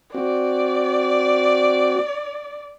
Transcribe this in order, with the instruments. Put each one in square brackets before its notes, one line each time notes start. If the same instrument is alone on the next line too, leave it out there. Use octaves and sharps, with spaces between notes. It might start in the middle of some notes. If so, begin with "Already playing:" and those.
[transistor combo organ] C4 F#4 [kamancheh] D5